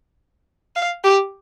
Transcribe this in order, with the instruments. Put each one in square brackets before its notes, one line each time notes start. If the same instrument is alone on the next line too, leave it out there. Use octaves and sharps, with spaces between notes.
[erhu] F5
G4